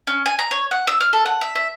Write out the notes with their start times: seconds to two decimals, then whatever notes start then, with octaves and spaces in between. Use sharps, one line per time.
0.07 C#4
0.26 G#5
0.39 A#5
0.51 C#5
0.71 F#5
0.87 E6
1.00 F6
1.13 A4
1.26 F#5
1.41 E5
1.55 E5